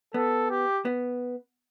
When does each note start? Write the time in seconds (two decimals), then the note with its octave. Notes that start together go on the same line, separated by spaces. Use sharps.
0.14 B3 A4
0.50 G4
0.85 B3